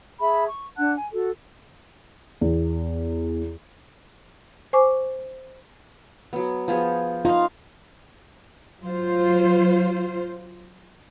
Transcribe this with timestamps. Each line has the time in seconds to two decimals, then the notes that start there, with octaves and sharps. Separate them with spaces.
0.21 G#4 E5 A5 B5
0.47 C#6
0.78 D4 F#5 A5 F#6
0.96 G#5
1.13 F#4 A4
2.41 E2
4.73 C5 G#5 C#6 D6
6.33 F#3 B3
6.68 F3 B3 G#4
7.25 D#4 F4 F5
8.81 F#3 F4 C5